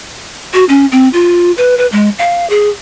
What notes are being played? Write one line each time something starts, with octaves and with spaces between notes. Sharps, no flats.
F#4
C#4
C4
F4
B4
B4
G#3
F5
G#4